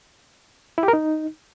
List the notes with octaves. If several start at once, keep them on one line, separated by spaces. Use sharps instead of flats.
E4
G4
A#4
D#4